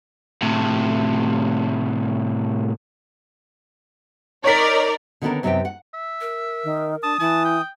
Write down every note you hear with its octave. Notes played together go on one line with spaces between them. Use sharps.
A2 C3
D#4 A#4 C#5 D5 B6
D3 D#3 G3 B3 C#4 A#4
F#2 C3 B3 D#4 G4 G5
F#5
E5
A#4
D#3
D4 A5 D#6
E3 E4 A5
G5